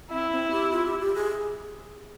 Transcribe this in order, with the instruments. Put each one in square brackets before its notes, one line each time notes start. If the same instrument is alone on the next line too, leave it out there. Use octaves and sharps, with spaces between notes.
[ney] C4 [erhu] E4
[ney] C4
G4
F4
G4
G4
G#4